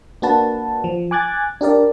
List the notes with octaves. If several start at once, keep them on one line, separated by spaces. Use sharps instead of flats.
A#3 D4 F#4 B4 A5
F3
G#5 D6 F#6 G#6 A6
D4 G4 A#4 D5